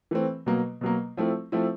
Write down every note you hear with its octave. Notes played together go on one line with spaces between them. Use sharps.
E3 A3 C4
B2 F#3 A#3
B2 F#3 A#3
F3 A3 C4 E4
F3 A3 C4 E4